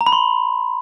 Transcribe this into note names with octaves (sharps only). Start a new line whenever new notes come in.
A#5
B5
C6